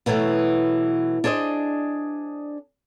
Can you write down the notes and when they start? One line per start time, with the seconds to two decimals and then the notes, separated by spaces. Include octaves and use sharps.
0.06 B2 E3 F#3 A3 B3
1.24 D4 G#4 C5 D5 D#5